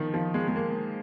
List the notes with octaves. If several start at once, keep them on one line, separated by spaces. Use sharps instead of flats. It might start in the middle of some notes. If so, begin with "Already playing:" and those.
Already playing: D#3 F3 D#4
F3
G#3
G#3
A#3